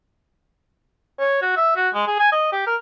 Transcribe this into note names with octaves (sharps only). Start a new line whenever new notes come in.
C#5
F#4
E5
F#4
G#3
G#4
G#5
D#5
G4
A#4